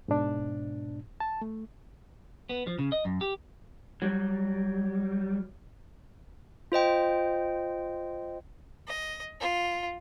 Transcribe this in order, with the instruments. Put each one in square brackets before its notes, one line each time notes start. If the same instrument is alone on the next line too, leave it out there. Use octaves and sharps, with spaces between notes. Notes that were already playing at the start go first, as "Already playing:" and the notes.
[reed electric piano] G#2 B2 D4
A5
A3
[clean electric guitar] B3
F3
C#3
D#5
F#2
G4
[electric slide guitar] F#3 G3
[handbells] F4 C5 D#5 G5
[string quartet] D#5
F4